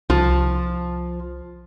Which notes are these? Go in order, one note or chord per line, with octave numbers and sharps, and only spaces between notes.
C2 F3